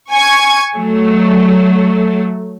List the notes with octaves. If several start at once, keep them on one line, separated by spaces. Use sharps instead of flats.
G#5 C#6 G#6
F#3 A3